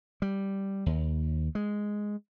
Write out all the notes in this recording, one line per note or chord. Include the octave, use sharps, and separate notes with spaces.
G3
D#2
G#3